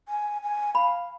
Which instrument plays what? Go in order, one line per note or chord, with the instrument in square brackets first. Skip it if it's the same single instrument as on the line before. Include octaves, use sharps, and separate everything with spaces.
[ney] G#5
G#5
[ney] F5 [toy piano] B5